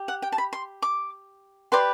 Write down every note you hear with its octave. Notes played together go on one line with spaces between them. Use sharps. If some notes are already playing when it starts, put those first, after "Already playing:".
Already playing: G4
F#5
G5
A5
B5
C6
D6
G4 B4 D5 C6